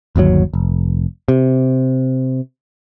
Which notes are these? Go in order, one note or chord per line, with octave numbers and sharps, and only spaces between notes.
G1 D#2 A#2 F#3
F1
C3